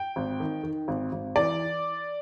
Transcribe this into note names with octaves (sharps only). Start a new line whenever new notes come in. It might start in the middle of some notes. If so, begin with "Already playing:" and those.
Already playing: G5
G#1
D#3
D#3
G#1
G#1
E3 D5